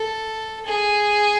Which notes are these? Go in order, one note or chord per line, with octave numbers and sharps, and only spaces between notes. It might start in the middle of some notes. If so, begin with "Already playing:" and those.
Already playing: A4
G#4